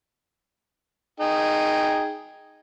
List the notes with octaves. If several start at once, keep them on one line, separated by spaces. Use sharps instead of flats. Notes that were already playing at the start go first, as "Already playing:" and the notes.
D#4 G#4 G5